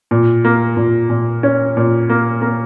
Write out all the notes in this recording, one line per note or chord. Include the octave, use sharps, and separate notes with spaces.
A#2
A#3
A#2
A#2
C#4
A#2
A#3
A#3